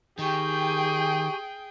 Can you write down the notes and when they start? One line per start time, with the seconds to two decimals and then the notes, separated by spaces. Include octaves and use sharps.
0.19 D#3 G4 G#4 G5 G#5 C#6